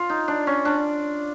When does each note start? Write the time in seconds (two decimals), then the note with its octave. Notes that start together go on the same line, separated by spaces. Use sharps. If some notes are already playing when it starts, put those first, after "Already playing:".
Already playing: F4
0.10 D#4
0.28 D4
0.47 C#4
0.65 D4